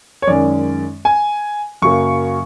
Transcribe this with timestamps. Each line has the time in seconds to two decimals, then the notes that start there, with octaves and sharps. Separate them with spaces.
0.22 C#5
0.27 F#2 D#3 G#3 C#4 D5
1.05 G#5
1.82 F#2 C#3 F#3 A#3 C#6